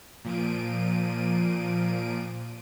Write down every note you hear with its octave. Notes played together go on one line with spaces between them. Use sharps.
A#2 F3 D7 D#7